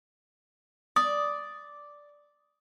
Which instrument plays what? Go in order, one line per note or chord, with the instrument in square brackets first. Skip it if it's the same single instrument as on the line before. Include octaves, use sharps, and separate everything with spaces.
[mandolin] D5 [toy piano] D#6